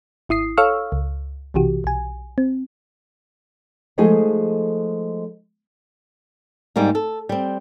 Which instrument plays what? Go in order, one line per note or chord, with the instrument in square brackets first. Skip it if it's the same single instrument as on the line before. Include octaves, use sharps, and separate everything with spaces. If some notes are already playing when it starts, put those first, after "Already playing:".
[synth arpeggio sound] G#1 E4 D#6 C7
A4 C#5 F5 C#6 E6 F6
C#2
B1 C3 E3 F#4 G4
B1 G#5
C4
[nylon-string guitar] F3 G#3 A3 D#4 G#4 G#5
G#2 G3 A#3 D#4
A4
G3 C4